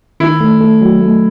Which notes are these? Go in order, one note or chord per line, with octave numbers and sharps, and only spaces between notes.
D#3 E4
A3
A3
F#3
A3